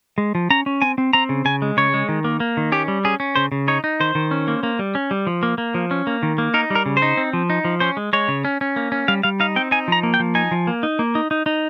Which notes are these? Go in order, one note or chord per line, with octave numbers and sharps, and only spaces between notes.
G#3
F3
C#4 A#5
C#4
C4 G#5
C4
C4 A#5
C#3
C#3 G#5
G#3
C#3 C#5
G#3
D#3
A#3
A#3
D#3
C#4 G4
G3
C#4 G#4
C#4
C#3 C5
C#3
D#4 C#5
D#4
D#3 C5
D#3
C#4
A#3
A#3
G3
C#4
G3
F3
A#3
A#3
F3
C#4
A#3
D#3
A#3
D#4 A#4
G3
A#4
C#3
C5
D#4
C4
F3
D#4
F3
C#4 C5
G#3
G#3 C#5
C#3
C#4
C#4
A#3
C#4
G3 F5
G3 F5
D#4 F5
C4 G5
D#4 G#5
F3 A#5
A#3
G5
F3
D#4 G#5
F3
A#3
D#4
A#3
D#4
D#4
D#4